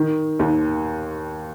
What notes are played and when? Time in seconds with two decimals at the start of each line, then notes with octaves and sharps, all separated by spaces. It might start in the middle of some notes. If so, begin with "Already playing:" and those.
Already playing: D#3
0.39 D#2